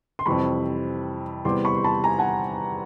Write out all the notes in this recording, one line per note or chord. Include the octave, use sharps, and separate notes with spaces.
C6
F2 C3 E3 G3 B5 C#6
E2 C3 E3 G3 C6 D6
B5 C#6
C6
A5 B5
G#5 A#5
F#5 G#5